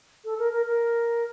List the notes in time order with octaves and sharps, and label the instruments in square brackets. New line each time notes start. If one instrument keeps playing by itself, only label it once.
[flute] A4
A#4
A#4
A#4